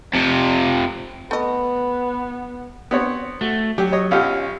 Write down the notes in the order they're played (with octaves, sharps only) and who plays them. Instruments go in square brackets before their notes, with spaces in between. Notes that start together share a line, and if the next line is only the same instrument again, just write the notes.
[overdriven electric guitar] F2 C3
[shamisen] A3 D#5 [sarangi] B3 [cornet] B4
[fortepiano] B3 C4 C#5
[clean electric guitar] A3 [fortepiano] F#4
[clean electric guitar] F#3 [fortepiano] G4
[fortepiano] C#5 D#5
[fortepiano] B1 F4 G4 [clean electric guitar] C#4